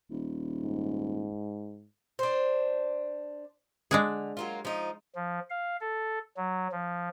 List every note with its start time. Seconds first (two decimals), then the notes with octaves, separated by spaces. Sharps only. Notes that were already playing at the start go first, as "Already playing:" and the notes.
0.10 D#1
0.64 G#2
2.19 D4 C5
3.91 D3 G#3 D4 G#4
4.37 F#3 A#3 F4
4.65 F3 D#4
5.15 F3
5.50 F5
5.81 A4
6.37 F#3
6.72 F3